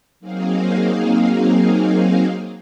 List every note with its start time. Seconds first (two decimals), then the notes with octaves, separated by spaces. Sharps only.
0.20 F#3 A#3 C4 D#4 G#4 F5